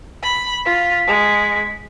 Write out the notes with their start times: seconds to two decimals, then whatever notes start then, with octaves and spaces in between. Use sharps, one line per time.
0.23 B5
0.65 F4 B6
1.07 G#3